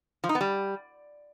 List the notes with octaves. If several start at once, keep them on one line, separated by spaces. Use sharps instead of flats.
F3
D#4
B3
G3